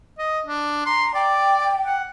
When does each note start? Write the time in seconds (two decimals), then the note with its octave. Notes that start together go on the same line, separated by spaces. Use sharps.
0.19 D#5
0.47 D4
0.86 A#5 C6
1.14 D5 G5
1.86 F#5